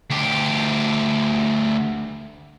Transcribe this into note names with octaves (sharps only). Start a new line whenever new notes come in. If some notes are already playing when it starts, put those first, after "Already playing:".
D2 G4